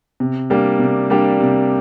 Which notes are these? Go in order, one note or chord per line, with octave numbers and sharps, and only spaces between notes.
C3
G3 A#3 D4 G4
C3
G3 A#3 D4 G4
C3